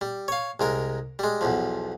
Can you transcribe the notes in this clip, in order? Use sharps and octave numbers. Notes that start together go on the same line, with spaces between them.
G3
C#5 F5
C2 G#3 A#4
G3 G#3
B1 E2 F3